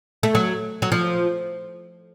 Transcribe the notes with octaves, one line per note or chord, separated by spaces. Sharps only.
A3
F#3
F#3
F3